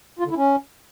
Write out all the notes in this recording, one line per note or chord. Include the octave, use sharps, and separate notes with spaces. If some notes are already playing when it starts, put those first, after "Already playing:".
F4
D3
E4
C#4